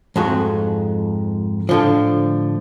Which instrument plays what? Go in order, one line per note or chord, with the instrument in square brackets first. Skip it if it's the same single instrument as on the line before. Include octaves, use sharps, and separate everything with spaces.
[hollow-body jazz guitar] F2 G#2 F#4
A2 D3 F3